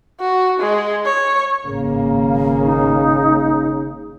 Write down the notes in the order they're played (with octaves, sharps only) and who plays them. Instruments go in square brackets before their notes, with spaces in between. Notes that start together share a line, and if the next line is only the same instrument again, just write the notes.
[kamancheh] F#4
G#3
C#5
[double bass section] G#1 A#3 [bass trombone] C#3
[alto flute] D#4